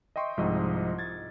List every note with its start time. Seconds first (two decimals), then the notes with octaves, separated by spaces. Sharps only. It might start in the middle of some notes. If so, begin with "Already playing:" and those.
0.16 D#5 E5 G5 C6 C#6
0.37 C2 G#2 F3 D#4 D#5 E6
0.98 G#6 A6